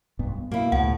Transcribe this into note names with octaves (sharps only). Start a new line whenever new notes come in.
B1 G2 B3
B2 A#3 E4
C#2 A2 F#5